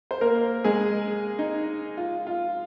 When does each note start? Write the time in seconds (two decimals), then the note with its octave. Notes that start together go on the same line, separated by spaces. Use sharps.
0.11 C5
0.21 A#3 A#4
0.64 G#3 G#4
1.39 D#4
1.97 F4
2.27 F4